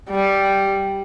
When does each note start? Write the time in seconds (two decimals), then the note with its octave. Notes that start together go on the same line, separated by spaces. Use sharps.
0.10 G3